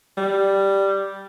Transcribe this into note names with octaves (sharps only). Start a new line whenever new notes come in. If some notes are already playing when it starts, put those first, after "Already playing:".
G3